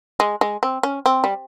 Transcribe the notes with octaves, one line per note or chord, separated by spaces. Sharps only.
G#3
G#3
C4
C#4
C4
G3